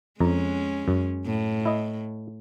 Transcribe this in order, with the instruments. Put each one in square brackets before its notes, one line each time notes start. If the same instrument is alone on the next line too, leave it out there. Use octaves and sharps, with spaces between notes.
[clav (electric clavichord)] F2 A#5 [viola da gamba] G#3 C#4
[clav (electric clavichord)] F#2
[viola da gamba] A2
[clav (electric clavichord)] E4 D#5